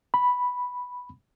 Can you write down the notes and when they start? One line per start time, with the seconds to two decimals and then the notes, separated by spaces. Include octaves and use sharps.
0.14 B5